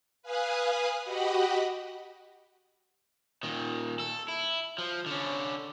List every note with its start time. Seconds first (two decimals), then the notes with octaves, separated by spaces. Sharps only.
0.22 B4 F5 G#5 D#6 F#6
1.04 F#4 G4 D#5 F#5 B5
3.43 A#2 D#3
4.00 A4
4.28 E4
4.78 F3
5.06 D3 C#4